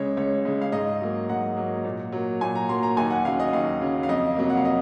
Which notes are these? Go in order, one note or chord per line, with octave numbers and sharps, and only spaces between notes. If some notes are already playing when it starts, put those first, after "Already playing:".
Already playing: C#2 C#3 G#3 C#5
C#2 C#5
C#3 G#3
F5
G#2 D#5
F#3 A#3
G#2 F#5
F#3 A#3
A#2
F#3 A#3
A#2 G#5
A#5
F#3 A#3 C6
A#5
D#2 G#5
F#5
C#3 F#3 F5
D#5
D#2 F5
C#3 F#3
F5
F2 D#5
C3 F#3 A#3
F#5
F5
D#5